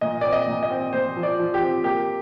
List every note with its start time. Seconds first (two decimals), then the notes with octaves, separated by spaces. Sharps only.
0.01 A#2 D#5
0.21 C4 D5
0.32 D#5
0.47 A#2
0.63 D#5
0.70 C4
0.93 A#2 C5
1.16 F3
1.23 D5
1.39 F3
1.54 G4
1.61 C4
1.84 A#3 G4